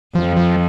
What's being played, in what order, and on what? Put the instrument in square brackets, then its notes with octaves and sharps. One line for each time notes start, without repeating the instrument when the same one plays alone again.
[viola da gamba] F2 [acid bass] F3
[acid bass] F3